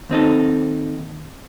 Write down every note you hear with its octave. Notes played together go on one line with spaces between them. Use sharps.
D#2 C4 D#4 A4